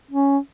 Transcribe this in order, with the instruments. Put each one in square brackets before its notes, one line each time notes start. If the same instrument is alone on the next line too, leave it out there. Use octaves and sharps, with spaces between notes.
[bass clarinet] C#4